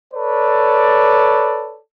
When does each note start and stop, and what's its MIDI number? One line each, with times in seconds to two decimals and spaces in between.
0.14 1.78 69
0.14 1.78 71
0.14 1.78 73
0.14 1.78 74